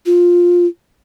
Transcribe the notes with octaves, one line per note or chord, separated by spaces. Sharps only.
F4